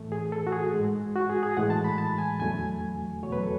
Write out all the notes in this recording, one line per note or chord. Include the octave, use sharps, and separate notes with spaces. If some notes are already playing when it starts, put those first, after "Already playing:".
Already playing: A2 E3 A3
G#4
A4
F#4
G#4
G#2 G#3
F#4
G#4
G#4
A2 E3 G#3 F#5
A5
B5
A5
G#5
E2 D3 F#3 A3 G#5
E2 B2 F#3 A3 C#5
B4
A4